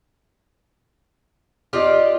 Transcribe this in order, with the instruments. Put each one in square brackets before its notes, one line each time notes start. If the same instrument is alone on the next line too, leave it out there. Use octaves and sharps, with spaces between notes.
[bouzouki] F4 G4 D5 [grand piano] D#5 C6 D6